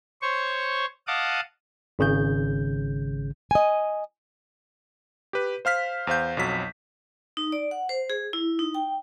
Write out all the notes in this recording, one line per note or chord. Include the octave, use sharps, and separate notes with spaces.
C5 C#5 C#6
D#5 F5 F#5 A5 D6 D#6
G#1 C#3 G6
D#5 G#5
G4 B4
C5 F5 F6 B6
E2 C5 F5 G6
B1 F2 F#3 B6
D#4
D5
F#5
C5
G#4
E4
D#4
G5